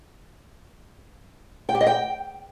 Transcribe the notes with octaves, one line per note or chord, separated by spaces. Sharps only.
G5
G4
D#5
G5